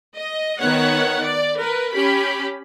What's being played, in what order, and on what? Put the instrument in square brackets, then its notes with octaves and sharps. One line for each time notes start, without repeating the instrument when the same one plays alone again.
[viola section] D#5
D#3 B3 C#5 F#5
D5
A#4 B4
C#4 G4 B5